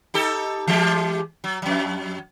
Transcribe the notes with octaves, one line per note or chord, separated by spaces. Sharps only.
D#4 G4 A4
E3 G#3 G4
F#3
F2 F#3